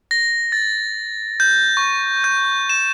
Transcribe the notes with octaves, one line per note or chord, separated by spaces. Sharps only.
A#6
A6
G6
C#6
G6
E7